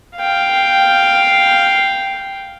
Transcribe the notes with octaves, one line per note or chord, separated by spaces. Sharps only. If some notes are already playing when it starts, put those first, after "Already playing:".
F5 G5